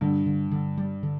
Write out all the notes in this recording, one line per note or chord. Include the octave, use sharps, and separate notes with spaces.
G2 D3
D3
D3
G3
D3